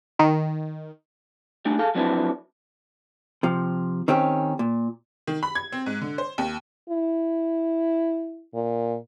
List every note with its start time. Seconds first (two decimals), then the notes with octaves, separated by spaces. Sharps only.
0.19 D#3
1.65 G3 A3 D4 D#4
1.79 G#4 A4 F5
1.95 F3 F#3 C4 D4 E4 B4
3.43 C3 F3
4.08 D#3 C4 C#4 G4
4.59 A#2
5.27 D#3
5.43 B5
5.55 G#6
5.72 C4
5.86 G#2
6.01 D3
6.18 C5
6.38 D#2
6.89 E4
8.54 A#2